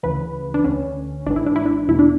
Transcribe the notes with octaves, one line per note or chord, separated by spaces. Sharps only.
D2 C#3 E3 B4
D4
D2 D3 C#4
G#1 G#2 E3 D4
E4
D4
E4
D4
E2 B2 E4
D4